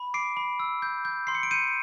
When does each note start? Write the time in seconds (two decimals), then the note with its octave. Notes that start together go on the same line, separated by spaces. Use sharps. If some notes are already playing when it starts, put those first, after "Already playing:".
Already playing: B5
0.14 D6 C7 D7
0.37 B5
0.60 E6
0.82 G6
1.05 G6
1.27 C6 C7
1.35 C#7
1.43 D7
1.51 G6 C#7 D#7